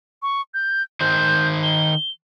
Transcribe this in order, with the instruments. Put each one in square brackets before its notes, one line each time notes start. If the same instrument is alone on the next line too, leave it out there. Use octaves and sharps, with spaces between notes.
[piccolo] C#6
G6
[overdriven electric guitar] D#3 C5 [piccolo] G6
[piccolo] G7